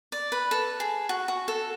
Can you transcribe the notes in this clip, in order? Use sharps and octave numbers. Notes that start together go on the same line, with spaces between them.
D5
B4
A4
G#4
F#4
F#4
A4